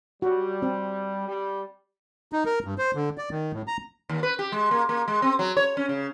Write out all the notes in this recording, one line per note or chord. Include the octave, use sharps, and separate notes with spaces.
G3 F#4
C4
G3
D#4
A#4
G2
C5
D3
D5
D#3
A2
A#5
D#2
B4
G4
G#3
A#3
A#3
G#3
C4
F#3
C#5
C#4
C#3